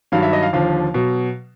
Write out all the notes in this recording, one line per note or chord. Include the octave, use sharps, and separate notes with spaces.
G2 D#3 F#3 F5
E5
D#5
F5
D#2 D3 F3 F5
B2 F#3